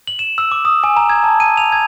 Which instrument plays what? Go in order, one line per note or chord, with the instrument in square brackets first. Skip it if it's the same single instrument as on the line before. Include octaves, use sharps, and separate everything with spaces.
[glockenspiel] F#7
E7
E6
D6
D#6
G#5
A#5
G#6
A5
D#7
F7
G#6